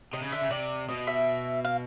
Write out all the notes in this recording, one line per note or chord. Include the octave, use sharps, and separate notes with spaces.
C3 D#5
C#3
D3 E5
C#3
C3 D5
B2 D#5
E5
F5